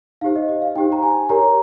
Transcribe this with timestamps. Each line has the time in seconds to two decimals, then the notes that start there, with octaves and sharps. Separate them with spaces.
0.21 D#4 G4 C5 F5
0.36 D#5
0.49 D#5
0.62 F5
0.75 D#4 G4 C5 G5
0.92 A#5
1.03 G#5
1.29 G4 A#4 C#5 A#5